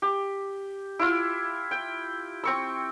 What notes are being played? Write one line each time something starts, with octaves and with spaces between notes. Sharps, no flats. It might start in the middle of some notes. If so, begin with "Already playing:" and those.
G4
E4 F4
G5
C4 C#6 E6